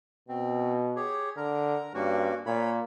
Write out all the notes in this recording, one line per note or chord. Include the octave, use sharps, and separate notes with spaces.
B2 C4
G4 G#4 C#5
D3 A#4 A#5
G2 A#3 C#4 F#4
A#2 C#5 B5